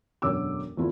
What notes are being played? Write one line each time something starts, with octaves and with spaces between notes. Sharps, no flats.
E1 F#2 D3 C#4 D6 E6
G#1 E2 A3 E4 F4